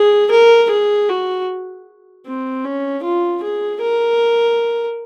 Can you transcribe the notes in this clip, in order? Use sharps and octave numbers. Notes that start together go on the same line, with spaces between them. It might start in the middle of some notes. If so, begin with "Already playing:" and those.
Already playing: G#4
A#4
G#4
F#4
C4
C#4
F4
G#4
A#4